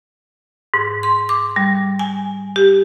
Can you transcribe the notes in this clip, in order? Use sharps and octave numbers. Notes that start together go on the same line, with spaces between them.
G#2
C6
D6
G3
G#5
G4